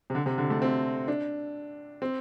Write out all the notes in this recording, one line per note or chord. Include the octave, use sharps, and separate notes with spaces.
C3
D3
C3
D3
A3
C4
D4
C4